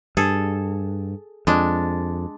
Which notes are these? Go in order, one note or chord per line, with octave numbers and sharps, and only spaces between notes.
G2 G#4 A4
F2 G#3 D4